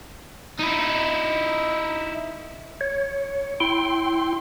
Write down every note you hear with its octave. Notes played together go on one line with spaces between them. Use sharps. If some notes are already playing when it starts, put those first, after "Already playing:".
D#4 E4
C#5
E4 G5 C6